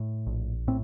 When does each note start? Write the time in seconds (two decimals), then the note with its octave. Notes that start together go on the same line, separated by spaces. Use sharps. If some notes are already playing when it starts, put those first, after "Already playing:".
Already playing: A2
0.27 A#1
0.68 A2 C4